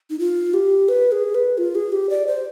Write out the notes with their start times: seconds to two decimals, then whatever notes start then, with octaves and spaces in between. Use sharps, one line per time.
0.10 D#4
0.19 F4
0.54 G4
0.89 B4
1.12 G#4
1.35 B4
1.58 F4
1.75 G#4
1.92 G4
2.10 D5
2.27 C5